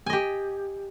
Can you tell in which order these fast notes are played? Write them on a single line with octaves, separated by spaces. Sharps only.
G#5 D#5 G4